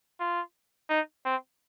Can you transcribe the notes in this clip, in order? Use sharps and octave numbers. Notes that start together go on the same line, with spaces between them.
F4
D#4
C4